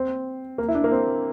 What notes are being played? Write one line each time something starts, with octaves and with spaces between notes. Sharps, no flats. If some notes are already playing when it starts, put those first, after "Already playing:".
Already playing: C4
A#3
E4
D4
A#3
C4